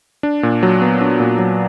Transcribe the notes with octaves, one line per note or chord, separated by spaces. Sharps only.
D4
A#2
F#3
B3
D4
A#2
F#3